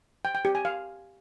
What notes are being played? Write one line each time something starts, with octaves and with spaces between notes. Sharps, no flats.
G5
G5
G4
G#5
F5